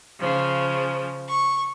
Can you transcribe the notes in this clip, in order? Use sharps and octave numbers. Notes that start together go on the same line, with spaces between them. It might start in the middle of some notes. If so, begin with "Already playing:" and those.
C#3 F3
C#6